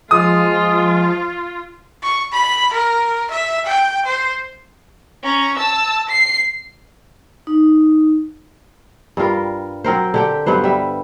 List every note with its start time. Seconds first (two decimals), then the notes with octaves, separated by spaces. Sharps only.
0.11 F3 G#3 F4 D#6
2.03 C#6
2.33 B5
2.74 A#4
3.31 E5
3.66 G5
4.06 C5
5.23 C#4 A#5
5.57 A5 E6
6.09 C7
7.47 D#4
9.17 G2 G3 F4 A#4
9.84 F#3 C4 A#4 C5
10.14 D3 G4 G5
10.46 G2 F#3 B3 C5
10.64 G3 E5